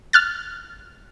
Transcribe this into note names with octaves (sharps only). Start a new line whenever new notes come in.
F6 F#6 A6